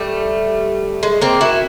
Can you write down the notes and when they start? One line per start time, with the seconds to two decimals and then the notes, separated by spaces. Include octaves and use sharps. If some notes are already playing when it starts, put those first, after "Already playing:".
Already playing: G3 A3
1.03 G#3
1.21 A#3 C4
1.41 E4 F#4